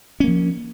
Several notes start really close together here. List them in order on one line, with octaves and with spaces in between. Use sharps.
C#4 A#3 F3